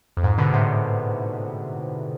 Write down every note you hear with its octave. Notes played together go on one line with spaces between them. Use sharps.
F2
G#2
B2 D3
A2 C3